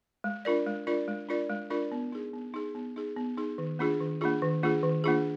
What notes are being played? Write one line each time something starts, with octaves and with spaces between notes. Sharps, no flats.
G#3
D4 F4 A#4 D5
G#3
D4 F4 A#4 D5
G#3
D4 F4 A#4 D5
G#3
D4 F4 A#4 D5
B3
D#4 G#4
B3
D#4 G#4
B3
D#4 G#4
B3
D#4 G#4
D#3
A#3 D4 F4 G#4
D#3
A#3 D4 F4 G#4
D#3
A#3 D4 F4 G#4
D#3
A#3 D4 F4 G#4